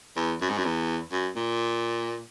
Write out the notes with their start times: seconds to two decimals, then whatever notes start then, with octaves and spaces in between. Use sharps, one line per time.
0.16 E2
0.41 F#2
0.49 G#2
0.57 F#2
0.64 E2
1.12 F#2
1.35 A#2